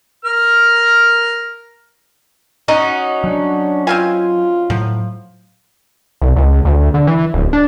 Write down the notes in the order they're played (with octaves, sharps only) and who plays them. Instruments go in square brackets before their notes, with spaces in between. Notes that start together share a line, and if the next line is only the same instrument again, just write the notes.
[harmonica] A#4 F6
[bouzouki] C#4 D#4 F#4 [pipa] D#5
[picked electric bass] F#3 [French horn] D4
[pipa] C4 F5 G#5 [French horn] F4
[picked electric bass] A2 F#3 [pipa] F3
[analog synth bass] C2
C#2
D2
D3
E3
D1
D4